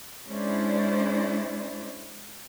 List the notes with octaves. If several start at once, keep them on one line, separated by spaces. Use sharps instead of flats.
G#3 C#4 D4 E4 C5 D5